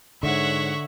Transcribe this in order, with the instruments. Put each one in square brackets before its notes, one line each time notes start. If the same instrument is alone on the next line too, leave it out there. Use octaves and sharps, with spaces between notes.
[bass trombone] G#2 [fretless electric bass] D3 [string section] C#5 F#5 C#6 [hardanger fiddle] E5